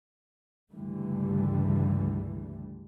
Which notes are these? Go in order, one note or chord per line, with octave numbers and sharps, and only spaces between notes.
C#2 G2 D3 E3 G3 A3